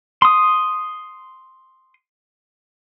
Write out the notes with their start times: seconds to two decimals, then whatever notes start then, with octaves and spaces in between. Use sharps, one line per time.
0.22 C6 D#6